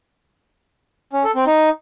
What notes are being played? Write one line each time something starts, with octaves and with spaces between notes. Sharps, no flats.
C#4
A4
C4
D#4